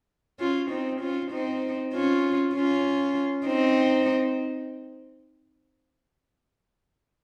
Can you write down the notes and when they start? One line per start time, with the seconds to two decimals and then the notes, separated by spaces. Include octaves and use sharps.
0.40 C#4 F4
0.71 C4 D#4
1.01 C#4 F4
1.32 C4 D#4
1.94 C#4 F4
2.54 C#4 F4
3.46 C4 D#4